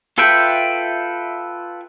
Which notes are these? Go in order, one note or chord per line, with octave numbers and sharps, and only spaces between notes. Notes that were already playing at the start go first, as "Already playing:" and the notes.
F4 A4 B4 E5 G5